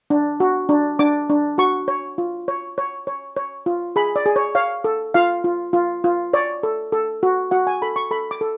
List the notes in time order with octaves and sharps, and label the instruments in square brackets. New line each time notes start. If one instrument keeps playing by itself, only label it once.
[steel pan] D4
F#4
D4
D4 D6
D4
F#4 C#6
C#5
F4
C#5
C#5
C#5
C#5
F4
G#4 B5
D5
G#4
C#5
C#5 F5
A4
F4 F5
F4
F4
F4
C#5 D5
A4
A4
F#4
F#4 F#5
G#5
A4 B5
C#6
A4 B5
D6
A4